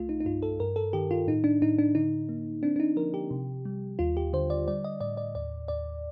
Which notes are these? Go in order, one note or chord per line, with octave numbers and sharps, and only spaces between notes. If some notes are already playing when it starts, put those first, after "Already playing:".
Already playing: C2 A3 F4
D#4
D#4
G2 F4
A4
G2 A#4
A4
D#3 G4
F4
A2 D#4
D4
A2 D#4
D4
D3 D#4
A#3
C4 D4
D4
D#4
F3 A#4
G4
C3
G3
D#2 F4
G4
D3 C5
D5
G3 D5
D#5
A2 D5
D5
D#2 D5
D#2 D5